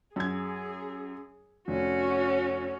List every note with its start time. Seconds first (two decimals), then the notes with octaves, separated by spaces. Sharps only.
0.16 F#2 G#4 G#6
1.68 F1 C#4 F#4